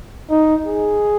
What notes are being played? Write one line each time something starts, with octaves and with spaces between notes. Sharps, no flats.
D#4
G#4